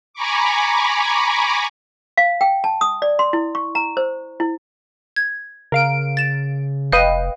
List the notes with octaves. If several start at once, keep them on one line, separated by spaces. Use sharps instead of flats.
G#5 A#5 B5 C#6 D6
F5
G5
A5
D#6
D5
C6
E4
C#6
A#5
C5
E4
G#6
C#3 A#4 F5 D7
A6 E7
F1 B4 D#5 F5 G5 D#7